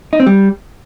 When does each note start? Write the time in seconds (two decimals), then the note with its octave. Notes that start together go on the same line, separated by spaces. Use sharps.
0.13 D#4
0.20 C4
0.26 G3